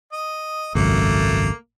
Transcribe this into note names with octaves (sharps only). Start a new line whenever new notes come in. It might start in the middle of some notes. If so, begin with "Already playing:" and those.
D#5
G#1 C#2 F#2 A3 A#3